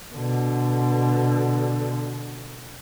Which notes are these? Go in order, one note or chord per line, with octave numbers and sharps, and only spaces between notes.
B2 D3